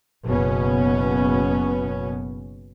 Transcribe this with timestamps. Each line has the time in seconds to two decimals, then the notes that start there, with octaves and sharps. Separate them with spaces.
0.25 F#1 B2 B3 C#4